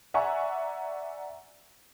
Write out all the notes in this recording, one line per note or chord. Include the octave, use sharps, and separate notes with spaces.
D5 E5 F#5 G#5 A#5 C#6